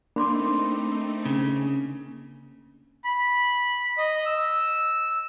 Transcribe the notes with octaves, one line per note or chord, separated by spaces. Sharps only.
A3 A#3 C4 D4 D#4 B5 C6 D6
C#3
B5
D#5
E6